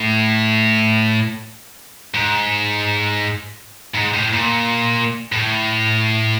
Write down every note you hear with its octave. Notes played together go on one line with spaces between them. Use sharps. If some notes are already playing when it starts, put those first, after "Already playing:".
Already playing: A2
G#2
G#2
A2
A#2
A2